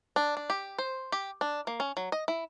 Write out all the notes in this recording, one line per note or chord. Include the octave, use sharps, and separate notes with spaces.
D4
D4
G4
C5
G4
D4
A#3
C#4
F#3
D#5
E4